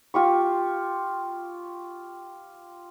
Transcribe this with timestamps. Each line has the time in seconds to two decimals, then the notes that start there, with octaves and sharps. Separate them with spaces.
0.14 F4 G4 C#6